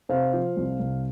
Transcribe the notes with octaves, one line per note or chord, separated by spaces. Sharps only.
C3 C5 F5
F3
C2
C2